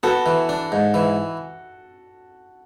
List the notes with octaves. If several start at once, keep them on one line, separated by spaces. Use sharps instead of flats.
B3 F#4 A4
E3
D4
G#2
E3